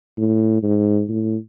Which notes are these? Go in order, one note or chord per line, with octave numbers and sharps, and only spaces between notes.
A2
G#2
A2